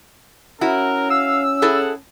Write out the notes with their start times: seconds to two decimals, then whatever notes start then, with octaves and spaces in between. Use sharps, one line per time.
0.61 C#4 E4 F#4 A#4
1.10 F5 E6
1.62 E4 G#4 A4 F#5